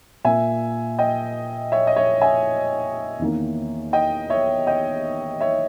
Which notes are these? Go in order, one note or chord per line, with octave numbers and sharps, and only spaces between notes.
A#2 A#3 E5 G#5
D#5 G5
C#5 E5
D#5
C#5 E5
E5 G#5
E2 D#3 A#3
D#5 G5
C#5 E5
D#5 G5
C#5 E5